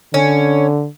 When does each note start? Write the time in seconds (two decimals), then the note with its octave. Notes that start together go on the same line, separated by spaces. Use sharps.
0.14 D3 C#4